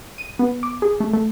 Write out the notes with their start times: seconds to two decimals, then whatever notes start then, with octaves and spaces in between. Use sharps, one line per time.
0.18 D#7
0.39 B3
0.63 D6
0.82 G#4
1.00 A3
1.14 A3